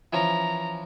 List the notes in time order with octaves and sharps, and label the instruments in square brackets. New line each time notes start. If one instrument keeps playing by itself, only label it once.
[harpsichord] E3 F3 C#4 [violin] A#5